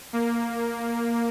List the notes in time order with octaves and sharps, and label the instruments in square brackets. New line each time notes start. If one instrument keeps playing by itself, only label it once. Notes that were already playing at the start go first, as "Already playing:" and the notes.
[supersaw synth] A#3